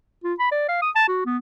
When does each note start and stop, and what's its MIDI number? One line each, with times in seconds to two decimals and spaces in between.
0.24 0.34 65
0.39 0.48 83
0.52 0.66 74
0.68 0.79 77
0.82 0.90 87
0.95 1.03 81
1.08 1.22 66
1.26 1.37 59